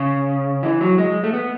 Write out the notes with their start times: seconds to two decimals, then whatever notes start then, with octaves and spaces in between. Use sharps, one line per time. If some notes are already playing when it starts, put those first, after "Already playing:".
Already playing: C#3
0.63 E3
0.81 F#3
0.98 G#3
1.24 A3
1.34 B3